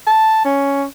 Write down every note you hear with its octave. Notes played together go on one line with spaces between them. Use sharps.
A5
C#4